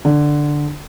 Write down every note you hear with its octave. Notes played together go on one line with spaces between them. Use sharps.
D3